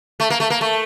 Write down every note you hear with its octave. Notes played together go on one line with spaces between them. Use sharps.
A3
A#3
A3
A#3
A3